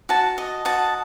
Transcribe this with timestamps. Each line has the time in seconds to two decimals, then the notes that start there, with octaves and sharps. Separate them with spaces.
0.09 F#4 A5
0.38 D#5
0.65 F#4 A5